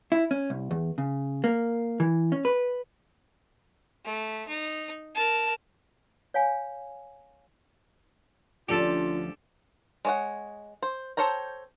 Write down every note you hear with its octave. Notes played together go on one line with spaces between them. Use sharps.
E4
C#4
C2
E2
C#3
A#3
E3
C#4
B4
A3
D#4
A#4 A5
C#5 F5 G#5
D2 F3 C#4 D4 F4 G4 A4 A5
G#3 C#5 F#5
C5
A4 C5 C#5 G5 A#5